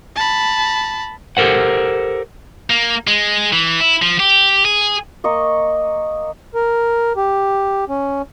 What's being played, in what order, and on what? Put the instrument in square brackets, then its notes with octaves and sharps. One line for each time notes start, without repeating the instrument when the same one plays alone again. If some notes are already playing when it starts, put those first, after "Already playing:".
[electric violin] A5 B5
[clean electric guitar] G4 A4 A#4 C5 F#5
[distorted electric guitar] A#3
G#3
E3
E4
F3
G4
G#4
[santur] A#3 D#5 C#6
[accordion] A#4
G4
C#4